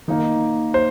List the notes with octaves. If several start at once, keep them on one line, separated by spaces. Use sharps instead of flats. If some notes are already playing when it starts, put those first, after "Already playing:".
D#3 A#3 D#4
C5